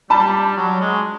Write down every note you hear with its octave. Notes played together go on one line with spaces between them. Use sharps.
G3 A5 B5
F#3
G#3